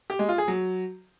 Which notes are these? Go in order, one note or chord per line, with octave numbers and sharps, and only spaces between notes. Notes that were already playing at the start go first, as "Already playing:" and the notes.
G4
G#3
F4
G#4
F#3